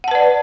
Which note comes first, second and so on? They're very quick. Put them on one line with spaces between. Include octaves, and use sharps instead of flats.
F#5 A5 B4 D5